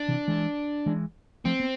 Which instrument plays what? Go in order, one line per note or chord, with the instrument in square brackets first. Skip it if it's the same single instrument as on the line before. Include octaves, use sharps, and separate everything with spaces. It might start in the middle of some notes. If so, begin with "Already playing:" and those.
Already playing: [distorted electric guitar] D4
[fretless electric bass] C3 E3
E3 G#3
E3 G#3
[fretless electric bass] F3 A3 [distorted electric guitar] C4
[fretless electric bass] B3